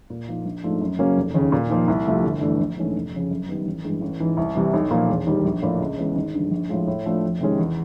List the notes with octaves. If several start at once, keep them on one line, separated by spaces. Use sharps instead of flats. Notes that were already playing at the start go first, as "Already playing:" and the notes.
A#2
F3 A#3 D#4
A#1
G#2 F3 A3 D4
F#2
C#3 F#3 A#3 C#4
F1
D#2 C#3
A#2
F3 A#3 D#4
C2
C3 F3 A3
G1
G2 E3 A3 D4
A#1
G#2 E3 A3 C#4
F1
F2 C#3
F#2
D#3 G3 B3
A1
G2 E3 G#3
A1
G#2 E3
C2
C3 E3 G3
B1
A#2 F3 A#3
E1
D#2 D#3 G3
A#1
A2 F3 A#3 D4
C#2
C#3 E3 G#3 B3
G#1
G2 D3 F3
A#1
A2 F3 G#3
A2
F3 A3 D4 F4
F2
C3 D#3 G#3 C#4
E2